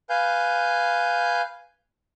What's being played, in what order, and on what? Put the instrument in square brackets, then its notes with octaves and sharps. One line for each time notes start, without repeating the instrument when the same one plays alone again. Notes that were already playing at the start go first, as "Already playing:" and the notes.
[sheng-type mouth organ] B4 F5 G#5 G6